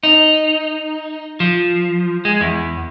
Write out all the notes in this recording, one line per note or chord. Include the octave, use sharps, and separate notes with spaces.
D#4
F3
G#3
E2